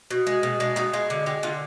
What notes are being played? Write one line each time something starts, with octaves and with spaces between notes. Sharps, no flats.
B2
G#3
B2
G#3 D4
B2 D#4
G#3 F4
D3
G#3 G4
D3 F4